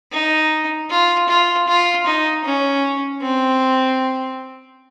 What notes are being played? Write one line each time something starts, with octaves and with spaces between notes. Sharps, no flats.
D#4
F4
F4
F4
D#4
C#4
C4